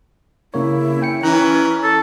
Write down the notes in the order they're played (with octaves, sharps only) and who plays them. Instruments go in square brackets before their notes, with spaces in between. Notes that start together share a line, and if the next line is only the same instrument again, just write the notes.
[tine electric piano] C#3 A#3 C#5 [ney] E4
[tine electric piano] C#4 G5 C#7
[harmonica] E3 [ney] C#4 [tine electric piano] A#5 F#6
[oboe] A4 [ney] A5